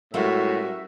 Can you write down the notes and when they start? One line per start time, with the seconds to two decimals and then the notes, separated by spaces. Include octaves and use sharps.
0.14 A2 G3 G#3 C#4 F#4 A#4 E5